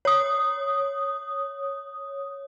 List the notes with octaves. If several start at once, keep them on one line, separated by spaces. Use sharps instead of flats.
C#5 D#6